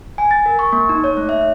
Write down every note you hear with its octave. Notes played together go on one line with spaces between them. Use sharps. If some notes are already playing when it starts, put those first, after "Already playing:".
G#5
A6
A#4
C#6
A#3
D#4
C#5
A3
E5